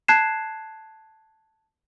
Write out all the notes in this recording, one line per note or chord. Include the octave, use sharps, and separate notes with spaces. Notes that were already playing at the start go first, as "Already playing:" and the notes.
A5 F#6 G#6 C7 E7